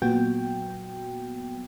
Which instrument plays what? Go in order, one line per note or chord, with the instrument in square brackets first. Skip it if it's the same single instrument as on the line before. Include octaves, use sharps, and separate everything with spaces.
[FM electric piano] A#2 F#3 B3 F#4 G5